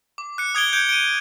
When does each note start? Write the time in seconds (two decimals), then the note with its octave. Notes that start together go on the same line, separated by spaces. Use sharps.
0.18 D6
0.38 F#6 C#7
0.55 D#6 G#6 D7 G7
0.73 G6 G#6 D7
0.89 D7 D#7